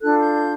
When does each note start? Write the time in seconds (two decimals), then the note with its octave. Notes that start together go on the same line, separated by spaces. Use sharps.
0.02 D4 F4 A4 F#6
0.19 G6